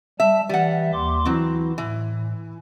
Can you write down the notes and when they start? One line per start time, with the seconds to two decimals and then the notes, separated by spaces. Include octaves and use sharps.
0.20 G3 E5 A5
0.49 E3 G3 E5 F#5
0.93 D#2 C6 D6
1.25 E3 F#3 C4 E4
1.78 A2 E3